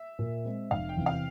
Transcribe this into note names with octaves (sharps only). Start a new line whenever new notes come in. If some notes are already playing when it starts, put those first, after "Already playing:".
Already playing: E5
A#2
G#3 C4
F1 F5
G5
E2 C3
F5